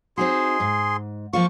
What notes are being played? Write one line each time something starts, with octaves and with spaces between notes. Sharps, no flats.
C4 D#4 F#4 G#4 C6
G#2
F3 A#3 F4 C#6